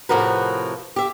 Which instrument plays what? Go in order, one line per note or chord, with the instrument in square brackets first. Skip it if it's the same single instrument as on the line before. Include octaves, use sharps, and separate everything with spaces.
[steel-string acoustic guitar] A2 C3 F3 F#4 A#4 B4
G4 E5